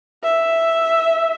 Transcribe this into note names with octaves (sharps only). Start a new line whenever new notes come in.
E5